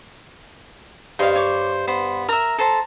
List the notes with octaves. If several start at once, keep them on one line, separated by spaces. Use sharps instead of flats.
G2 C5 D#5 F5
C#5 D6
B3 C5
A#4 E5 A#5
A4 C5 A5